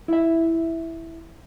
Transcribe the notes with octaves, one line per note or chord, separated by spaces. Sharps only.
E4 E5